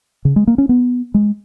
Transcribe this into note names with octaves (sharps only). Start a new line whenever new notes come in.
C#3
G#3
A#3
C#4
B3
G#3